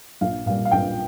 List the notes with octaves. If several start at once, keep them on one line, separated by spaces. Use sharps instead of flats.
A#1 F5
A#2 G3 F5
F5
A#1 G5